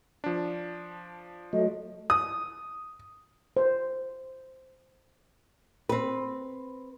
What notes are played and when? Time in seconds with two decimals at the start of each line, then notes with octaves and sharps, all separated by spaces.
0.24 F3 D4
1.53 F#3 A3 D#5
2.10 D#6
3.57 C5
5.89 C4 B4